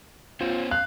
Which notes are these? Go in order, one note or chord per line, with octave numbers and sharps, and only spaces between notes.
B3 C#4 F4 C5
F5 F#6